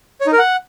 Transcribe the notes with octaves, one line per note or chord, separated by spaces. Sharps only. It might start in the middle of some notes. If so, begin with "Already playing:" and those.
C#5
D#4
A#4
F#5